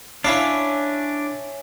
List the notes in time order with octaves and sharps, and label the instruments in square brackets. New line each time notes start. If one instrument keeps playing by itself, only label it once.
[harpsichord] C#4 E4 F5 [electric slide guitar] D4 [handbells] C#5 E5 G#5